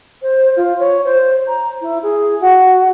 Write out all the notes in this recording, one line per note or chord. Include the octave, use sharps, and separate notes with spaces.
C5
F4
C#5
C5
A#5
E4
G#4
F#4